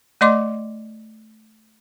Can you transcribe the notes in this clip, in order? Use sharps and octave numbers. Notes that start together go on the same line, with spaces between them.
A3 D5 D#5 C6 D6